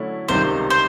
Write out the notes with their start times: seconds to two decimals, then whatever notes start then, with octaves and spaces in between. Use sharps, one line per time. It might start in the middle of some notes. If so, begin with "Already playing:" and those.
Already playing: D3 F#3 A3 C#4 E4
0.29 C#2 C3 D#3 G3 C5
0.70 C5